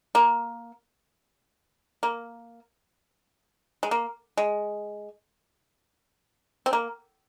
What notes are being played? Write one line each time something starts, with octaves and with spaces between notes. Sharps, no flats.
A#3
A#3
G#3
A#3
G#3
C4
A#3